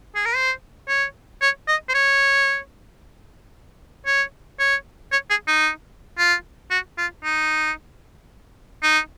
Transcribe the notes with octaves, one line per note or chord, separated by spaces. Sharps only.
G#4
A#4
C5
C#5
C#5
D#5
C5
C#5
C#5
C#5
C#5
G#4
D#4
F4
F#4
F4
D#4
D#4